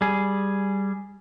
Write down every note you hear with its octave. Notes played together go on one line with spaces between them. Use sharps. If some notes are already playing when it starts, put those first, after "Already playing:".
G3 G#4